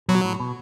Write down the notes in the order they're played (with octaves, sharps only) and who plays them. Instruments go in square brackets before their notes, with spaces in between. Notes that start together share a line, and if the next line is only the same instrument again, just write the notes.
[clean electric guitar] B2 [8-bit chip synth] F#3
[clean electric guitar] A2
B2